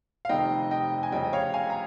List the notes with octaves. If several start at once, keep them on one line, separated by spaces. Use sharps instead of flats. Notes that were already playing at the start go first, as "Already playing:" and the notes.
F5
F1 F2 C3 D#3 D#5 G5
D#5 G5
G#5
F1 F2 C#3 D#5 G5
D#5
C#5 F5
F5 G#5
A#5